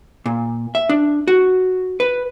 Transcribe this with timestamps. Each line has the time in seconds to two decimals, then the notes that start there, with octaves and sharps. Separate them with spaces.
0.26 A#2
0.75 E5
0.89 D4
1.28 F#4
2.00 B4